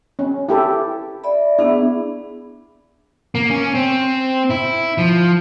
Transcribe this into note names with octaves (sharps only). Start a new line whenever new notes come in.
C#4
E4 G4 A4
D5 E5 B5
B3 D4 E4 G#4
A#3
C#4
C4
E4
F3